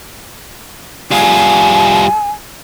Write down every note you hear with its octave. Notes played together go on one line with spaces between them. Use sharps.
G3 F4 G#5